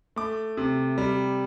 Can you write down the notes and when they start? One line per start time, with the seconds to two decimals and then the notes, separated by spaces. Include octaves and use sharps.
0.16 A3 D6
0.57 C3
0.98 G3